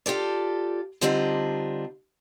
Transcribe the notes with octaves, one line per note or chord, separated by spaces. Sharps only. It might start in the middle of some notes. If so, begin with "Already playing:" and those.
F4 G4 A4 D5
D3 G3 C4 D4 D#4 F4